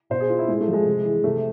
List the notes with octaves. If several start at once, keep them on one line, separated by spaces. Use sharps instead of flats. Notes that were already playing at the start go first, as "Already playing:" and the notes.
B2 C5
G#4
F4
E4
A2 G#3
A3
F3
G#3
C3
E3
C3 A3